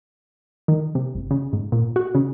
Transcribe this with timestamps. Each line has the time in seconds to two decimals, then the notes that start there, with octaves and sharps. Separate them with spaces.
0.68 D#3
0.95 C3
1.15 G1
1.31 C#3
1.53 G#2
1.72 A#2
1.96 F#4
2.15 C#3